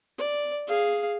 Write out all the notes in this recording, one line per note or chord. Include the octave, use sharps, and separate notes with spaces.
D5
G#4 F5